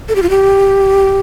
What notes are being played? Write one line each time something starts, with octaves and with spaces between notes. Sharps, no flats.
A4
G4
F4
G4